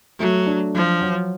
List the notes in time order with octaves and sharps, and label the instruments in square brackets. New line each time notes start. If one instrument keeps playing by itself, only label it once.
[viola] F#3 [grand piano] A3
[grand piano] D4
[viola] F3 [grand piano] F#3
[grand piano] F#3